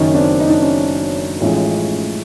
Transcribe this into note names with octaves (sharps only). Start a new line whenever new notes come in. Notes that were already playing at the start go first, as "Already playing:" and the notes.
Already playing: F#1 F#2 D#3 C#4 D#4
C4 D4
D#4
D4
C#4 D#4
A1 A2 F3 G#3